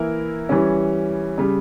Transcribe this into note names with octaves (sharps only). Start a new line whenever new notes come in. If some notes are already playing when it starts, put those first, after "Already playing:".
Already playing: E3 A#3 E4 A#4
E3 G3 C#4
C#3 G3